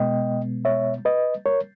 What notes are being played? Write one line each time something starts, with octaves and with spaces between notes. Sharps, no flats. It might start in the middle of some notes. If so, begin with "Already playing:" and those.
Already playing: B2 G#3 B3 D#5 G5
C#5 E5
B4 D#5
A#4 C#5